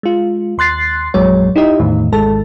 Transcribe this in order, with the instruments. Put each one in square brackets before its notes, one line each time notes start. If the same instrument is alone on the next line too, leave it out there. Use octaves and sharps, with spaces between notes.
[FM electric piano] G#3 F4
D#2 C6 F#6 A6 C7
A#1 F#2 A#2 F#3 G#3 C#5
D#4 E4 G4 D#5
E2 A2 D#3
G#1 D#3 G#3 A4 A5